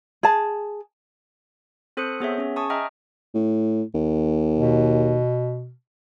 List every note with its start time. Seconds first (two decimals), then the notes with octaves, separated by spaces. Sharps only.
0.23 G#4 A5
1.97 C4 A4 C5 D#6 F#6 C#7
2.20 B3 G#4 C#5 E5
2.38 C#4 G#4
2.56 G#5 A5 C#6 D#6
2.70 D#5 E5 G5 A#5 F6
3.34 A2
3.94 D#2
4.57 B2